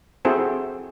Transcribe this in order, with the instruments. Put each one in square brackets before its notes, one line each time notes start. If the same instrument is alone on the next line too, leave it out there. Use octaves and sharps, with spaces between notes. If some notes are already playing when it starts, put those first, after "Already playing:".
[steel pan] C4 E4 F#4 G#4 A4 C5